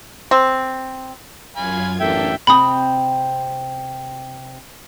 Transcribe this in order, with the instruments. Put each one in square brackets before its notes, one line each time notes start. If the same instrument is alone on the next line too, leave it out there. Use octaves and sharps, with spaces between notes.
[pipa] C4
[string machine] F#2 F4 G#6 [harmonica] F5 G#5 B5
[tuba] A1 [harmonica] D3 A#3 A4 [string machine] D4 [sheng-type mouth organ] E5 G5
[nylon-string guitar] C3 C4 G5 [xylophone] B5 D#6